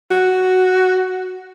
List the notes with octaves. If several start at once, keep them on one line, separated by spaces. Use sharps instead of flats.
F#4